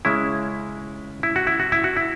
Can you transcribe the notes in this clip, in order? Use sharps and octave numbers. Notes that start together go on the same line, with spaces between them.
C#3 G#3 C#4 E4
E4
F#4
E4
F#4
E4
F#4
E4